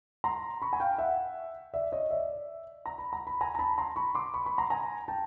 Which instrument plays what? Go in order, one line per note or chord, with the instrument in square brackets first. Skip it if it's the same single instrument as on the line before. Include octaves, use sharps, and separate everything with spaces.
[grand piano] A#5 C6
B5 C#6
G#5
F5 G5
E5 F#5
D5 E5
C#5 D#5
D5 E5
A#5
B5
A#5
B5
G#5 A#5
A#5
A5 B5
A#5 C6
B5 C#6
C6 D6
B5 C#6
B5 C#6
A#5 C6
G#5 A#5
G5 A5